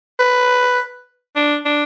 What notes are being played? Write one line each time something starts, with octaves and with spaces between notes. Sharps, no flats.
B4
D4
D4